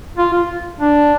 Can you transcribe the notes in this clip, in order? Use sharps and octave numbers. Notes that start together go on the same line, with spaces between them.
F4
F4
D4